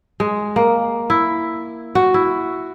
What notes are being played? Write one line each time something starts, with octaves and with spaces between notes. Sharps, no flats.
G#3
A#3
E4
F#4
E4